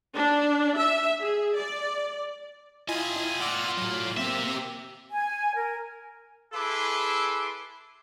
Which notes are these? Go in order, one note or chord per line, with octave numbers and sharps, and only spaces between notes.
D4
E5
G#4
D5
E4 F4 G4 D#5 G#5
F4 D5 F#5 E6 F6
A2 F#3
A#3 C4 G4 E5
G#5
A#4
E4 G#4 A4 B4 C6 D6